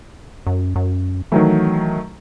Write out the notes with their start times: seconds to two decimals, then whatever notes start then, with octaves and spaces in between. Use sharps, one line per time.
0.47 F#2
0.76 F#2
1.32 D#3 E3 F#3 A3